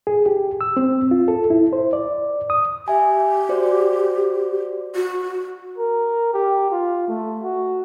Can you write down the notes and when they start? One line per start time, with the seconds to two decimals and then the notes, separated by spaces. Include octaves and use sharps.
0.07 G#4
0.26 G4
0.61 E6
0.77 C4
1.11 F4
1.28 A4
1.50 E4
1.73 C5
1.93 D5
2.50 D#6
2.88 G4 E5 G#5
3.49 F#4 C5 D5
4.95 F#4
5.78 A#4
6.34 G4
6.71 F4
7.08 A3
7.43 F#4